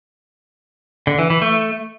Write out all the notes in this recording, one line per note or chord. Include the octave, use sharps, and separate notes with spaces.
D3
E3
E3
A3